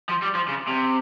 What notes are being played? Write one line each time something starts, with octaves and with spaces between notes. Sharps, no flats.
F3
G3
F3
C#3
C3